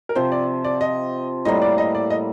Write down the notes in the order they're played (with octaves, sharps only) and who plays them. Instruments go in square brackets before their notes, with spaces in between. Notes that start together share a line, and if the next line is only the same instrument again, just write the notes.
[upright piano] A#4
[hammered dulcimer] C3 F3 C4 [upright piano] C5
[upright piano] D5
D5
D#5
[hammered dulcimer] A2 G3 A#3 [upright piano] D#5
[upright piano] D5
D#5
D5
D#5